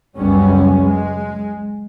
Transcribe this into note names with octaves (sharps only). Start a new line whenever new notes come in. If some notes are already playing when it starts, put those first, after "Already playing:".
F#1 C#2 F#2 G3 B3 C#4
G#3